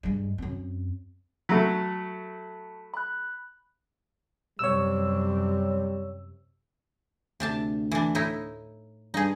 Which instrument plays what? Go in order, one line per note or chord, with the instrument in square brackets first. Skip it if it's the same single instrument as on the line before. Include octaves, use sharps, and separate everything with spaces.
[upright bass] G2 G#3
F#2 C4
[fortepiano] F#3 A3 [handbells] A5 B5 B6
[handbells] B5 F#6
[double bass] F#2 C3 [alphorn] G3 [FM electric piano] C#5 E6
[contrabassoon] D2 [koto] C3 D4 A5
[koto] E3 D4
A2 D#4 E4
[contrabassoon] G2 [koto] D#4 G#4